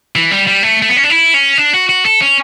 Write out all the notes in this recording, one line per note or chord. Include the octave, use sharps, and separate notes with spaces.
E3
G3
G3
A3
A3
B3
C#4
D4
E4
C#4
D4
F#4
F#4
A4
C#4